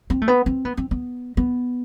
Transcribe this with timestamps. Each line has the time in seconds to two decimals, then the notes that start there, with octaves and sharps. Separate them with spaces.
0.10 C4
0.22 A3
0.28 B3
0.46 C4
0.65 B3
0.77 C4
0.91 B3
1.37 B3